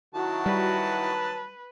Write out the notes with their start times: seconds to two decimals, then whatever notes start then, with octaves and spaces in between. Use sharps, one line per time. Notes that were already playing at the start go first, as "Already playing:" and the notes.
0.15 D#3 F#3 E4 F#4 A5
0.46 G3 B4